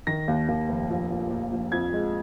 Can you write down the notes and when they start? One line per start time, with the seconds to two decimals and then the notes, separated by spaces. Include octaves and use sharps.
0.07 D#3 A#6
0.28 D#2
0.48 D#2
0.69 F1
0.89 A#1
1.10 A#2
1.30 A#2
1.51 A#1
1.72 F2 G#6
1.93 G#3